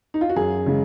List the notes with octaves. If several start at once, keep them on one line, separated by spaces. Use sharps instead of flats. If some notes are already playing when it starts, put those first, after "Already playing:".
D#4
F4
F#4
F#2 G#4
C#3 G#3